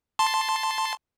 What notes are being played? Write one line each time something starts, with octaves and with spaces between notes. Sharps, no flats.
A5 C6